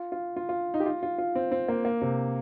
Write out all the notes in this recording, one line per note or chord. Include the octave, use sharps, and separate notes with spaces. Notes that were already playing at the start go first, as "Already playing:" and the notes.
Already playing: F4
F4
F4
F4
D#4
G4
F4
F4
F4
C4
C4
A#3
A#3
C3